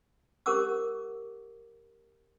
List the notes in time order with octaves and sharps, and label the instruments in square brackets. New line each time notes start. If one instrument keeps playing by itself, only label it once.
[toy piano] G4 A#4 C5 F#5 D6 E6